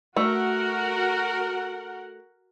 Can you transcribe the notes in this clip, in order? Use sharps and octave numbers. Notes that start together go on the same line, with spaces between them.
A3 F#4 A#4 F#5